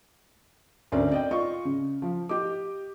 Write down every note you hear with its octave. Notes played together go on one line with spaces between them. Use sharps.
D2 C4 C#4 A#4 D5
D5 D#5 G5
F4 D#5 C#6
C#3
F3
G4 D#5 D6